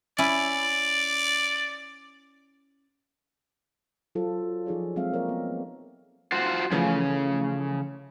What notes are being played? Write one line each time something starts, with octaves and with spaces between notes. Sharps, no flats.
C#4 E4 D5
F#3 F4 A4 C5
F3 D#4 G#4 C#5 D5
F#3 G#3 C4 E5 F5
A#3 A#4 C#5 D5
B3
F4 F#4 C5
C#3 E3 F3 A3